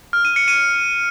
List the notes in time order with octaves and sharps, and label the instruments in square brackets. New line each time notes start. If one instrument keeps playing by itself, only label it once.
[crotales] F6
D#7
C#7
D#7